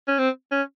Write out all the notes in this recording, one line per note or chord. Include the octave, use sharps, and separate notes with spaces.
C#4
C4
C#4